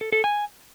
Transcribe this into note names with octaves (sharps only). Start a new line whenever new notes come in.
A4
A4
G#5